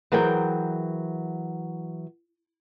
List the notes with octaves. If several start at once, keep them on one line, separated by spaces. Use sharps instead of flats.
E3 F#3 G#4 A#4 C5 G5